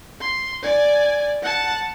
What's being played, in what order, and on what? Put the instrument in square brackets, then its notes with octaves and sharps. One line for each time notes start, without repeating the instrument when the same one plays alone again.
[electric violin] C6
D5 G#5
F#5 A5